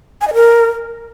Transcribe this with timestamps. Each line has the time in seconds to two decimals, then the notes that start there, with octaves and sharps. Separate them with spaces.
0.21 G#5
0.28 D#5
0.34 A#4